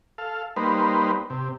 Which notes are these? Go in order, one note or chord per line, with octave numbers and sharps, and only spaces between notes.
A4 F5
G3 A#3 D#4 B4 C5
C3